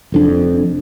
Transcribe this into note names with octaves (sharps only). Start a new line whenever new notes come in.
F1 F2 D4